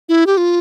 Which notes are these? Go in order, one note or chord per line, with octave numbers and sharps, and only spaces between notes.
E4
G4
F4